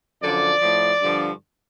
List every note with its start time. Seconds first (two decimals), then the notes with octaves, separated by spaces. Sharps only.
0.22 F#2 D3 F3 D5
0.62 A2 F3
1.01 G2 D3 F3